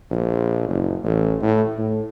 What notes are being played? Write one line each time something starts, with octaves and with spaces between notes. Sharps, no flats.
A#1
F#1
A1
A2
A2